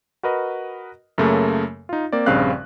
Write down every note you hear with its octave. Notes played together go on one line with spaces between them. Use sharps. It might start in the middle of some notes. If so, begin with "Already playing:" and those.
F#4 A#4 B4 D#5
F#2 C#3 A3 A#3
D#4 F4
A#3 C4 D5
A#1 G2 C#3 C4 F5 F#6